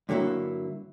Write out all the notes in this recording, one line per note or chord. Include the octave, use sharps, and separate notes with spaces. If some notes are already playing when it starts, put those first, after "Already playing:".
G2 D3 F#3 A#3 E4